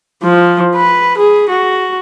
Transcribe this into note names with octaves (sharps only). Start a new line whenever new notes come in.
F3
B4
G#4
F#4